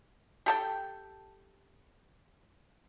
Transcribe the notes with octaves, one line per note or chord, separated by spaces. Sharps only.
G4 A4 G5